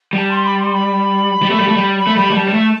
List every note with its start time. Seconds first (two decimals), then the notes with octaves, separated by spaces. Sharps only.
0.13 G3 A5
0.31 C6
0.45 B5
0.59 C6
0.73 B5
1.42 G3
1.51 A3
1.60 G3
1.68 A3
1.76 G3
1.98 B5
2.07 A3
2.16 G3 B5
2.30 A3
2.34 G3 A5
2.48 G3
2.54 A3